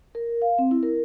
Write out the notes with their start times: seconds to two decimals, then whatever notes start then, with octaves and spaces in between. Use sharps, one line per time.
0.15 A#4
0.42 F5
0.58 C4
0.71 E4
0.83 A#4